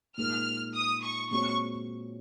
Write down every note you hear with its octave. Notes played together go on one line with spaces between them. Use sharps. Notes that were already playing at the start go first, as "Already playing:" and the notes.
A#2 G#3 D#4 A#4 F6
D#6
C#6
A#2 G#3 C4 F#4 C#5 C#6